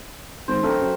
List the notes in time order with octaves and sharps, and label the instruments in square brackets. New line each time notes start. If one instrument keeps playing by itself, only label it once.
[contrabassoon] G#1 [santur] C5
[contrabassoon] D1 [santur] A3 A#4 G5
[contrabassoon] F#2